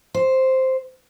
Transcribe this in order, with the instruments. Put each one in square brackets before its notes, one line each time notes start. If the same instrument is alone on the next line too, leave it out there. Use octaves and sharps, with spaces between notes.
[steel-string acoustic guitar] C5